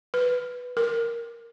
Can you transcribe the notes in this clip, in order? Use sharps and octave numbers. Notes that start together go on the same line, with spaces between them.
B4
A#4